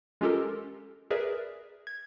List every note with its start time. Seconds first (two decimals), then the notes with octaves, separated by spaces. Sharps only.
0.21 G#3 C#4 F4 G4 A4 A#4
1.11 G#4 A#4 B4 D5 E5
1.87 G#6